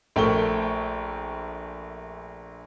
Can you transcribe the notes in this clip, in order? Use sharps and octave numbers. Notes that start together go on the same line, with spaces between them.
A#1 A3 A#4 G5 C#6 G7